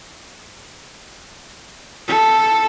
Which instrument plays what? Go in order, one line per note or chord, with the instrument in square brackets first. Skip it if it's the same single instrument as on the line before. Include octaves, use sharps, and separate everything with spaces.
[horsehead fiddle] A4